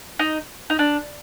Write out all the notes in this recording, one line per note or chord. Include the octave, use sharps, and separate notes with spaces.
D#4
D#4
D4